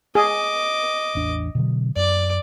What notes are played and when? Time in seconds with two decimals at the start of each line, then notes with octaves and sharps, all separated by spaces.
0.15 G#4 D#5 D6
1.15 A1 E2 D4
1.55 B2 D3 F#3
1.96 F#2 D5 D6